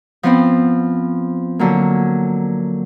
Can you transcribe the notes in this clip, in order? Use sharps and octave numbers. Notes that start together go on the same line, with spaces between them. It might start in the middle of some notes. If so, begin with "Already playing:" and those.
F3 B3 C4
D3 F#3 A#3